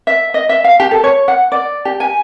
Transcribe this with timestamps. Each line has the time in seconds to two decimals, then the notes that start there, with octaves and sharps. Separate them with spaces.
0.07 E5
0.34 D#5
0.49 E5
0.64 F5
0.80 G4
0.91 A4
1.04 C#5
1.28 F#5
1.52 D5
1.85 G4
2.00 G#5